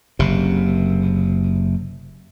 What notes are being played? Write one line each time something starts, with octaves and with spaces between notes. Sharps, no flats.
F#1 C3